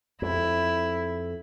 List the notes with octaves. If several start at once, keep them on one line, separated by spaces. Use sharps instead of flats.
F2 E4